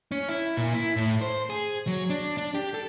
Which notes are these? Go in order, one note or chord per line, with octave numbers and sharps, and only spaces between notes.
C#4
E4
A#2
E4
A2
C5
G#4
F#3
D4
D4
G4
A4